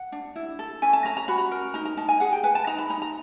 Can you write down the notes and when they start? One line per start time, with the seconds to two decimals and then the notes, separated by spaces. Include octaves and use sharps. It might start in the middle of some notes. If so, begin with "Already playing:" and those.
Already playing: F#5
0.12 D4
0.36 E4
0.59 A4
0.82 C#4 G#5
0.93 A5
1.05 C#4 A#5
1.17 A#5
1.28 F#4 B5
1.38 A#5
1.51 A#4
1.74 D#4 A#5
1.85 A#5
1.97 D#4 A5
2.09 G#5
2.20 G#4 F#5
2.32 G5
2.43 B4 G#5
2.55 A5
2.67 D#4 A#5
2.79 B5
2.90 D#4 A#5
3.02 A#5